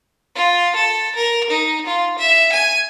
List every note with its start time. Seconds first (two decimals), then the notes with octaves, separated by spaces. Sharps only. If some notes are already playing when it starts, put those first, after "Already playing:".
0.35 F4
0.76 A4
1.15 A#4
1.50 D#4
1.86 F4
2.19 E5
2.53 G#5